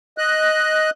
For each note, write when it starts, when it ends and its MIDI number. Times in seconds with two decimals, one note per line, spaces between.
0.18 0.90 75
0.18 0.90 90